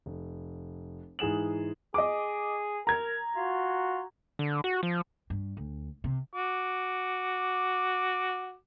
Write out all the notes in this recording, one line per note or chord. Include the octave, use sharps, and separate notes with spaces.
F1
G#2 E3 G#4 E7 F#7
G#4 D#5 D6
A#4 A#5 G#6
F4 F#4
D3
F#4
F3
G2
D2
C3
F#4 D6